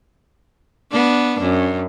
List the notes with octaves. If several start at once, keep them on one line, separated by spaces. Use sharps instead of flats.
B3 D4
F#2